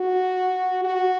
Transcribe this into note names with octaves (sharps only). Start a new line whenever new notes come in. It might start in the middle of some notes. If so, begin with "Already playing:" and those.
Already playing: F#4
F#4